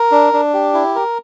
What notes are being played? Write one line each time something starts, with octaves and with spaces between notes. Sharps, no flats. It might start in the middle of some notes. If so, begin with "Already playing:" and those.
Already playing: A#4
D4
D4
G4
E4
A#4